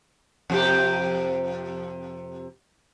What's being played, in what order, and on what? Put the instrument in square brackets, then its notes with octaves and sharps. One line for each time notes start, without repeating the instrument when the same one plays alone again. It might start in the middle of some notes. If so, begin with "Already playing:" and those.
[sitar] F2 C3 G4